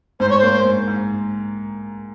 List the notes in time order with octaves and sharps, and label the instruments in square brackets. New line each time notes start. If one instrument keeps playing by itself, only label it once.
[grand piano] G#2 [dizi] C5
[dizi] C#5
[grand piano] A#3 [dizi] C5
[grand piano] G#2
G#2